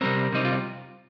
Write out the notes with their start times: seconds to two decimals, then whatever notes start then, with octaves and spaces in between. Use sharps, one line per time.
0.01 C3 G3 C4 A#4
0.32 C3 G3 C4 D#4
0.45 F4